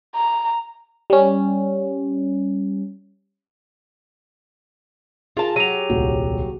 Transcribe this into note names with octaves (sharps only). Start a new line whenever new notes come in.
A#5
G3 C#4
F4 G#4 A#4 A5
F#3 G4 D#7 F7
D#1 C2 F#4